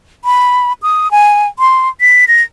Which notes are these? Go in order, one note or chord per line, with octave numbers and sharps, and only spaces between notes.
B5
D#6
G#5
C6
B6
A#6